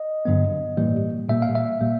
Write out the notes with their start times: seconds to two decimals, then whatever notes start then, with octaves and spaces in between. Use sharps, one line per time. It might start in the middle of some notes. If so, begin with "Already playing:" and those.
Already playing: D#5
0.25 G2 D3 F#3 B3
0.77 A2 E3 G3 A#3
1.29 A#2 G3 A#3 E5
1.42 F5
1.55 E5
1.80 A#2 G3 A#3